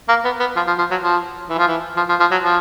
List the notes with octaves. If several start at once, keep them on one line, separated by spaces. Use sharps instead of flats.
A#3
B3
B3
F3
F3
F3
F#3
F3
E3
F3
E3
F3
F3
F3
F#3
F3